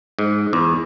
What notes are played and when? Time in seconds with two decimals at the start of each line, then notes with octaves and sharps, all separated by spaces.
0.19 G#2
0.53 E2